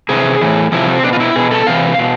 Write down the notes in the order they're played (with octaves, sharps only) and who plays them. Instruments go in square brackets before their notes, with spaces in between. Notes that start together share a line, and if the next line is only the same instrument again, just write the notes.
[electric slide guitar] C3 E3 G#4
A2 E3
C3 F3 E4
C4
B2 D4
F4
E4
B2 G#4
A4
C3 E3 F5
B2